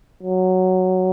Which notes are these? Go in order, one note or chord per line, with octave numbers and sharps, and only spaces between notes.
F#3